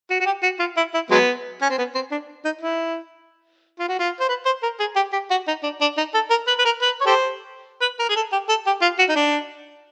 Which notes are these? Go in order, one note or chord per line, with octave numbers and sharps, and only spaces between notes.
F#4
F#4
G4
F#4
F4
E4
E4
F#3 G#3 B3
C#4
C4
B3
C4
D4
D#4
E4
F4
F#4
F4
C5
B4
C5
A#4
G#4
G4
G4
F#4
D#4
D4
D4
D#4
A4
A#4
B4
B4
A#4
B4
C#5
G4 A4 C5
B4
A#4
G#4
A4
G4
A4
G4
F4
F#4
D#4
D4